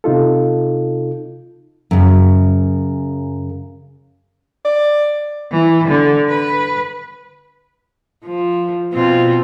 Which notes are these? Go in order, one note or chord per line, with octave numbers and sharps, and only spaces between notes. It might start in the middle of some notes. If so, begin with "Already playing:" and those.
C3 D#4 F4 A4
F#2 C#3
D5
E3
D3
B4
F3
B2 C4 F4